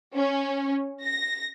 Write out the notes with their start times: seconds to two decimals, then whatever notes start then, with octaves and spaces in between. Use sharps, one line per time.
0.15 C#4
1.03 A#6